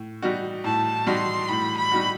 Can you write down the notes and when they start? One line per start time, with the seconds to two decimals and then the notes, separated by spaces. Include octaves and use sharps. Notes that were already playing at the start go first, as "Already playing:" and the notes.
Already playing: A2
0.22 G3 D#4 F#4
0.64 A2 A5
1.06 G3 D#4 F#4 C6
1.49 A2 B5
1.77 B5
1.92 G3 D#4 F#4